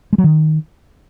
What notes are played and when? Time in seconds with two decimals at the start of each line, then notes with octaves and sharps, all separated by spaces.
0.13 G#3
0.18 F#3
0.24 D#3